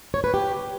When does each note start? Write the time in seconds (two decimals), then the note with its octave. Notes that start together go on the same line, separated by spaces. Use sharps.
0.14 C#5
0.24 B4
0.34 G4